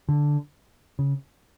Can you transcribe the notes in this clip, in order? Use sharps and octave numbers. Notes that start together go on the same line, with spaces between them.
D3
C#3